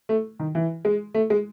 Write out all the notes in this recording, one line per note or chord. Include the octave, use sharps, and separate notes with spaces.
A3
D#3
E3
G#3
A3
G#3